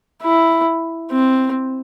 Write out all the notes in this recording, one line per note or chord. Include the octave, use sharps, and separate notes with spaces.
E4
C4